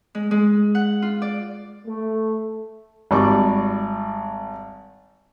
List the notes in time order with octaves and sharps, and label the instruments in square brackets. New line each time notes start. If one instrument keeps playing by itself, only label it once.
[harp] G#3
G#3
F#5
F4
D5
[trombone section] A3
[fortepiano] G#1 G3 D5 C#6 D6